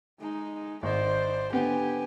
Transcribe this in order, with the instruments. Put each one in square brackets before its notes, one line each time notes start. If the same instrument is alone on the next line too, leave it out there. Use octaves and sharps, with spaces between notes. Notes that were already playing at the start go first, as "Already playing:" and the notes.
[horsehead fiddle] G#3 D#4
[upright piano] G#1 D#5 [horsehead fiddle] C5 D5
[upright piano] D3 B3 [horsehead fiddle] G4 G#5